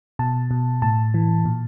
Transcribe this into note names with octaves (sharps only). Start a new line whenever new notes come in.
B2 A5
B2
A2 A5
E3
A#2